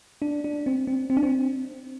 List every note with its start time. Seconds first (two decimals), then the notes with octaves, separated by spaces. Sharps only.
0.22 D4
0.44 D4
0.66 C4
0.87 C4
1.10 C4
1.17 D4
1.23 C4